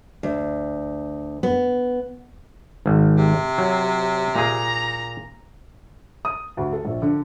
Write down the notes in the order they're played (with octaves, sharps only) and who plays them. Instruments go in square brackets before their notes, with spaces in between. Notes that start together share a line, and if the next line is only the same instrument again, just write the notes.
[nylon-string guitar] D2
B3
[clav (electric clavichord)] G#1
[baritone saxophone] C3
[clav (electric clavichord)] F#3
[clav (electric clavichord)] A#2 G#4 [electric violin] A#5
[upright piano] D#6
D2
A4
A#1
D3